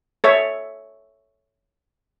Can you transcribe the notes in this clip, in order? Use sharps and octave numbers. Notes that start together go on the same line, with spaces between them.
A4 C#5 E5